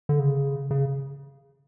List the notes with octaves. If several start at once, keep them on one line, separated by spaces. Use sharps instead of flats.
D3
C#3
C#3